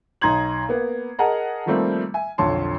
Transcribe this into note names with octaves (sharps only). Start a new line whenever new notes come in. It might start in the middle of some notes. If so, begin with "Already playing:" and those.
B1 D#4 A#5 C6 G#6 F#7
A#3 B3
G#4 A#4 D#5 F#5 A5 A#5
D#3 F3 G3 A3 A#3 C4
E5 G#5
B1 F2 D3 C#5 A5 C6